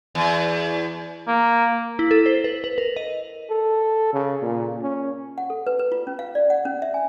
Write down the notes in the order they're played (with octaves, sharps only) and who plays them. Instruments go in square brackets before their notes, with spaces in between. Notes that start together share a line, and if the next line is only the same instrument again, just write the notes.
[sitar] E2
[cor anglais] A#3
[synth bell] E4
A4
C5
B4
B4
A#4
D#5
[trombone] A4
C#3
A#2
C#4
[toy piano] F#5
A4
B4
B4
F4
C#4
F5
D5
F#5
C#4
E5
G#5